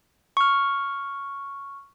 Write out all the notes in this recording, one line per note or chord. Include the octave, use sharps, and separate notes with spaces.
C#6 F6